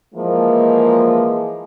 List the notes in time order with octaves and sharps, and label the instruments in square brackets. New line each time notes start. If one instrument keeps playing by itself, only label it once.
[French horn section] E3 F3 G#3 A#3